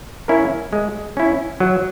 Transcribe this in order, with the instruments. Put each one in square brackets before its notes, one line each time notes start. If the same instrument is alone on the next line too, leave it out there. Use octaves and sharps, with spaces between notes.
[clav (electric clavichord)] C#4 E4 A#4
G#3
C#4 E4
F#3